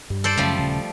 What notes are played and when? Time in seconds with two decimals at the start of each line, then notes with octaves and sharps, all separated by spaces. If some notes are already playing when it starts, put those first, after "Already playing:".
0.10 G2 G3
0.24 A4 C5 D5
0.37 F#2 C#3 F3 G3 A3
0.59 D#1 C#3